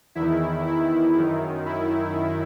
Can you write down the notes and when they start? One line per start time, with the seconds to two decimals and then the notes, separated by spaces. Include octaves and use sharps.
0.15 E2 D#3 E4
0.65 E4
1.15 F#2 D#3
1.66 E4